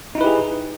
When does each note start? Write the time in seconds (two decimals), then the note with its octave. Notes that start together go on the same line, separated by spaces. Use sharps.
0.15 D#4
0.18 E4
0.21 B4
0.24 G4
0.26 G#4